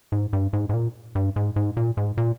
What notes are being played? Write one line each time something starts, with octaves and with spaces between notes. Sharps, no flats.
G#2
G2
G#2
G#2
A#2
G2
G#2
G#2
A#2
G#2
A#2